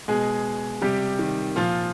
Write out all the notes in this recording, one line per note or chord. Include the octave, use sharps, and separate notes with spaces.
B2 G#3 G#4
C3 G3 G4
D#3
A#2 F3 F4